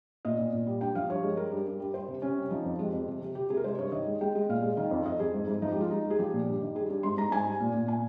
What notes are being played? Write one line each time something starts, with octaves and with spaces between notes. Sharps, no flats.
A#2 D#5
A#2
A#2
G3
G2 G5
F3 F5
G2 C#5
G#3
G3 A#4
G2
G2
G3
G3 C5
C3
C3 C#4
G3
F3 D#4
F2
G#3 G4
F2
C3
C3
C3 G4
C3 G#4
A#4
G#3 C5
G2 C#5
D#3 D#5
G#3
G#3 G5
G#3
A#2 F5
G#3
D#3 F5
F2
F2 D#5
F2 G#4
G#2
G#2
F3 D#4
G4
G#3 F4
G#3 D#4
G#3
G#4
F3 G4
A#2
G2
D#3
G3 G#4
G2
G#2 C6
G#2 A#5
G#2 G#5
G3
A#2
A#2
A#2 G#5